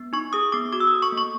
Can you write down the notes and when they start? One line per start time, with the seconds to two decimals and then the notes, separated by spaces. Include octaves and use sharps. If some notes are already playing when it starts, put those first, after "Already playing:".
Already playing: B3
0.13 D#4 C#6
0.33 G#4 D#6
0.52 B3 D6
0.72 F#4 D6
0.80 E6
0.87 D#6
0.92 A4
1.02 C#6
1.12 A#3
1.17 C#6